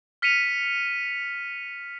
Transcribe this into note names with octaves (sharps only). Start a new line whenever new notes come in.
F6 B6 C#7 D#7 F7